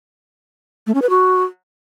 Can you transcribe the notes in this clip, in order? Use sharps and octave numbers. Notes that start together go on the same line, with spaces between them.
A3
C#4
B4
F#4